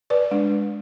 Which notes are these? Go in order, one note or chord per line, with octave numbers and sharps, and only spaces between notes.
B4 D5
G#3 D4